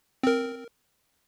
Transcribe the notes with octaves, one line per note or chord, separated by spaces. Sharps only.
C4 A#4